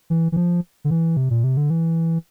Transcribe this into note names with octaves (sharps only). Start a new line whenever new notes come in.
E3
E3
F3
D3
E3
C3
A#2
C3
D3
E3